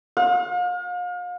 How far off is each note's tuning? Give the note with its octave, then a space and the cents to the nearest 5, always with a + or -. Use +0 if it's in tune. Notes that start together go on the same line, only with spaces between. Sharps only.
F5 +40